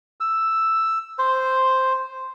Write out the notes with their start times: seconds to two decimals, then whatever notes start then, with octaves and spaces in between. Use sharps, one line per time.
0.20 E6
1.18 C5